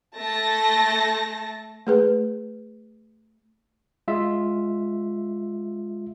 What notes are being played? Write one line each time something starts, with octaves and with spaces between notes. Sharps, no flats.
A3 A5 A#6
A3 G#4 B4
G#3 F4 E5